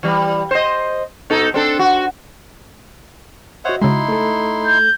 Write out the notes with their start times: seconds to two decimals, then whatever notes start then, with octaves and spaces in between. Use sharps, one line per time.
0.03 E3 G3
0.51 C5 D#5
1.30 B2 D#4 A4
1.54 C4 D4 A4
1.79 F#4
3.65 F#4 C5 C#5 D#5 E5 F#5
3.82 C#3 G#3 D#4 E4 C6
4.09 A3 A4
4.64 G6